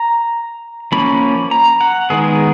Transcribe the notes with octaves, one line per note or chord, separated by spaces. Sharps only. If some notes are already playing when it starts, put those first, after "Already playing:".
Already playing: A#5
F3 A#3 C#4 B5
A#5
F#5
D#3 G#3 B3 G#4